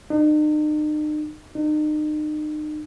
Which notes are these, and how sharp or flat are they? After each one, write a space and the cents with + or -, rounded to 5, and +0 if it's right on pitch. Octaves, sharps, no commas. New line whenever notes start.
D#4 -40
D#4 -35